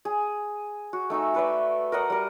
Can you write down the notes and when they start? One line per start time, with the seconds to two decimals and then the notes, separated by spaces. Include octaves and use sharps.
0.05 G#4
0.93 F#4
1.10 A3 D#4 G#5 E6
1.34 A4 B4 D5 E5
1.92 A#4 D#5 F#5 A#5
2.10 G3 A#4